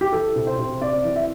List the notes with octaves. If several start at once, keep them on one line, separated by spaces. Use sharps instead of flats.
G4
E3 A4
C3
C5
C3
C4 D5
E3
E5